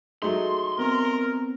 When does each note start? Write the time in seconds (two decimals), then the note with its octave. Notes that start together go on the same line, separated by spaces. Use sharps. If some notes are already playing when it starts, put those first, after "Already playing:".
0.22 F#3 A3 D#4 G#4 C6
0.79 B3 C4 A#4